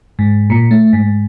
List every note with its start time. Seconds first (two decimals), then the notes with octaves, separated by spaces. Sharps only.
0.19 G#2
0.50 A#2
0.71 A3
0.93 G#2